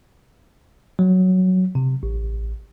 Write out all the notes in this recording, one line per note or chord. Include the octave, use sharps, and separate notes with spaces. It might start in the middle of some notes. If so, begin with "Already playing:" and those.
F#3
C3
A1